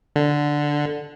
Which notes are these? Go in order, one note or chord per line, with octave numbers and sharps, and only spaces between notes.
D3